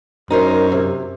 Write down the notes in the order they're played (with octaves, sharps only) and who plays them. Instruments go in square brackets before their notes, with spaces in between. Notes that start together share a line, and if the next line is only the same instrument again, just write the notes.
[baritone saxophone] F#2 [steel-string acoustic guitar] D#4 A#4 C5
[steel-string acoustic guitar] C3